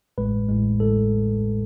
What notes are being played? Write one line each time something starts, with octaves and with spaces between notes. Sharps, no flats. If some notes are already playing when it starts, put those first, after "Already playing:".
A1 A2 G#3 B4
A1 A2 G#3
A1 A2 G#3 A4